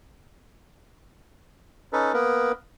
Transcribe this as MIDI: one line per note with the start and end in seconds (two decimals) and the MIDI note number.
1.93 2.13 61
1.93 2.13 63
1.93 2.13 69
1.93 2.13 71
2.14 2.52 58
2.14 2.52 59
2.14 2.52 70
2.14 2.52 71